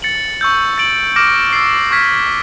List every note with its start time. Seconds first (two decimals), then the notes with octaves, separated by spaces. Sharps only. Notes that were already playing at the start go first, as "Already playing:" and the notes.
0.02 A6 C#7 F#7
0.41 C#6 E6 G6
0.78 A6 D7 F#7
1.16 D6 F6 A#6 D7
1.53 E6 A6 C7
1.91 C#6 F6 G#6 B6